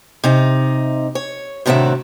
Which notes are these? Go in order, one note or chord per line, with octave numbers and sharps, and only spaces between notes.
C3 D#4
C#5
A2 C3 D#3 D4 F#4 E5